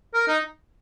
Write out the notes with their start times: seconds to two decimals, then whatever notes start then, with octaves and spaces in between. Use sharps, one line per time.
0.14 A#4
0.28 D#4